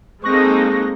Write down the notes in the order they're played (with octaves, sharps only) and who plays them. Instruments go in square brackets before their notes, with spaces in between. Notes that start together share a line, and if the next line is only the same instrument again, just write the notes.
[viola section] G#3 A#3 D#4 [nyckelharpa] C4 A4 [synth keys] C#6 F#6 A#6